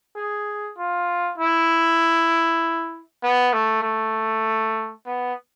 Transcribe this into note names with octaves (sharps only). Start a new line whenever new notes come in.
G#4
F4
E4
B3
A3
A3
B3